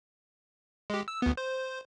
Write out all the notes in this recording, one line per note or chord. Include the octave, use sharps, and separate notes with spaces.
G#3 G4
E6
D2 B3
C5